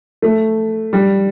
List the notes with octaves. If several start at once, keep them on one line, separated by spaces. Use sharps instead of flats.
A3
G3